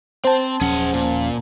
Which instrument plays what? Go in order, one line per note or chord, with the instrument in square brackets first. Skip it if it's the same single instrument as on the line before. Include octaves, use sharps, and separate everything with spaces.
[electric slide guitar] C4 [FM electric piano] C5 A5
[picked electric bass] D#1 F3 C#4 [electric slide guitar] G#4 F#5
[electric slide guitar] A#2